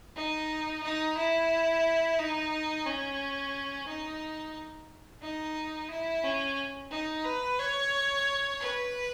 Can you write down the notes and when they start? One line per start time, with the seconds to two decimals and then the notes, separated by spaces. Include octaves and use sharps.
0.16 D#4
0.83 D#4
1.17 E4
2.19 D#4
2.86 C#4
3.87 D#4
5.22 D#4
5.90 E4
6.24 C#4
6.91 D#4
7.24 B4
7.59 C#5
8.60 B4